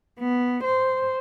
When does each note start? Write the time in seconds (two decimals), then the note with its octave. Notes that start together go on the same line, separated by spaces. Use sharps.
0.20 B3
0.64 C5